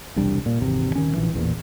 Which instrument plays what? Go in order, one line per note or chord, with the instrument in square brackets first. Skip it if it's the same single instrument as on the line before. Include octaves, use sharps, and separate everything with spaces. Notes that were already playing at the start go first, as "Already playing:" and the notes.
[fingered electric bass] E1 C2 G3 D4
A#2
G#1 E2 C3
D#1 D#3 C#4
A#1 E3
A1 E2 A#2